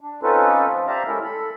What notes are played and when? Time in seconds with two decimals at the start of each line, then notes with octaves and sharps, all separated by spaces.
0.01 D4
0.23 C4 C#4 D#4 F4 A4 B4
0.67 F3 F4
0.87 G4 C5 D5 E5 F5 A#5
1.07 G#3 C#4 E4 A4 A#4
1.24 A4 B5